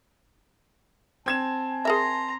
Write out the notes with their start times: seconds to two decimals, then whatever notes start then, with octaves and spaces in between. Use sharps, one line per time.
1.26 C4 G#5 A5 G#6 E7
1.85 G#4 A#4 E5 A#5 C6